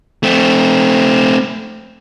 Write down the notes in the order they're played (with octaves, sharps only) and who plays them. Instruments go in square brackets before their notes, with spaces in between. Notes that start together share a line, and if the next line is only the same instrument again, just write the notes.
[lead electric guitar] A3 C4